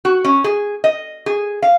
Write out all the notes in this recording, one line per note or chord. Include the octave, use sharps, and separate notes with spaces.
F#4
C#4
G#4
D#5
G#4
F5